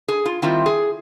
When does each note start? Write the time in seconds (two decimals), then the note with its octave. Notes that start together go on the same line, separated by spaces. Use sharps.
0.08 G#4
0.26 F4
0.42 D#3 G3 C4 E4 F4
0.66 G#4